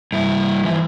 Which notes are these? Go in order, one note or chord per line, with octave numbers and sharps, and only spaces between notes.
G2 E4
E3 F3